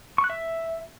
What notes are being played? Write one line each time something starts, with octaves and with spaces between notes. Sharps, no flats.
C#6
F#6
E5